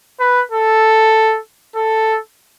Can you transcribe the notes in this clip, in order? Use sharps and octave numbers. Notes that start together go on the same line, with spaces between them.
B4
A4
A4